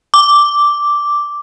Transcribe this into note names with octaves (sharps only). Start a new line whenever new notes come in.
D6